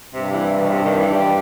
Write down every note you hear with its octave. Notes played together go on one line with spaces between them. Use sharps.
G2 C3
E3
C3
B2
C3
D#3
E3
G3